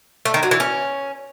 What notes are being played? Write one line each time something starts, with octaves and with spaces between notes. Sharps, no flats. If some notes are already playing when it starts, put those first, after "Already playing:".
A3
D#3
F#3
E3
C#4